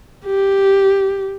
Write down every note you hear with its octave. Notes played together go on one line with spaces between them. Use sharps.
G4